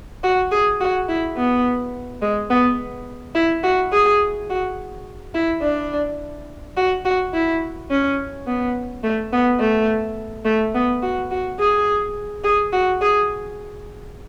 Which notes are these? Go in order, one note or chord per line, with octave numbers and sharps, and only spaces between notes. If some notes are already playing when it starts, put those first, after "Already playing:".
F#4
G#4
F#4
E4
B3
G#3
B3
E4
F#4
G#4
F#4
E4
D4
F#4
F#4
E4
C#4
B3
A3
B3
A3
A3
B3
F#4
F#4
G#4
G#4
F#4
G#4